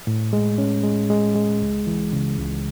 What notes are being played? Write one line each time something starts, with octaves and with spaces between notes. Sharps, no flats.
A2
G#3
C#4
G#3
G#3
G#3
C#2
E3
C#3
C#2